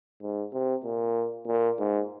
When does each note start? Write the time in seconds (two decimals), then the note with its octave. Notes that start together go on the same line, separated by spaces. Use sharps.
0.22 G#2
0.53 C3
0.84 A#2
1.47 A#2
1.79 G#2